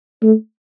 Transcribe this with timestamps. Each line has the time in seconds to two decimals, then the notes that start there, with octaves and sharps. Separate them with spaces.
0.23 A3